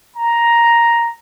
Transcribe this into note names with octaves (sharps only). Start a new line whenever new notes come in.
A#5